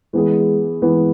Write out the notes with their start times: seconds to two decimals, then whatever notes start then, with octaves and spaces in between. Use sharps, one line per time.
0.13 E3 G#3 B3 G#4
0.82 E3 G#3 B3 G#4